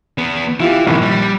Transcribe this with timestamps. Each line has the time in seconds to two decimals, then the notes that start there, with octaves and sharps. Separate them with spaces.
0.18 E2 B3
0.60 E3 E4 F4 G4
0.87 A#1 G2 D#3
1.02 G3